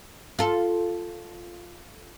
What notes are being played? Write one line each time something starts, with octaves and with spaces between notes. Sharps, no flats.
F4 A4